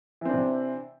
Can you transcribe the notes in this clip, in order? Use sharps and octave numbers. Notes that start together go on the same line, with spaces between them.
C3 E3 C4 D4